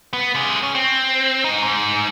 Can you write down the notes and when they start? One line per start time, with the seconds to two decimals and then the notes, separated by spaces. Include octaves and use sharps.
0.13 B3
0.35 C3 G#4
0.63 C#4
0.75 C4
1.44 G#2 D#4
1.63 G#2